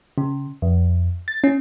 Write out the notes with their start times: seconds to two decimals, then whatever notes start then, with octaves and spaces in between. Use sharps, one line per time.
0.18 C#3
0.62 F2
1.28 A6
1.44 C#4